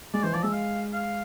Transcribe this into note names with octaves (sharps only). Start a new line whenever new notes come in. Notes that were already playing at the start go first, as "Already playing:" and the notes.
G#3 D5
E3 C5
F3 D5
G#3 E5
F5
F5